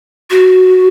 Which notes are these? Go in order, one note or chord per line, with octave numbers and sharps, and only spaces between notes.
F#4